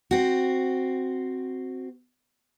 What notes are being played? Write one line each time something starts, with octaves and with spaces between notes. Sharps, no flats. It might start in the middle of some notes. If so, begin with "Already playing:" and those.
C4 F#4